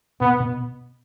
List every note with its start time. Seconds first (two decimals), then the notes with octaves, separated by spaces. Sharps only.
0.21 B2 B3
0.40 B2